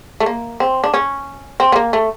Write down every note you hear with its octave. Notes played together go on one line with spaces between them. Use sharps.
A3
A#3
C4
D4
C#4
C4
B3
A#3
A3